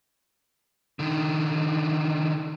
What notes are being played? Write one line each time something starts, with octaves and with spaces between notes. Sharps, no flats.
D3 D#3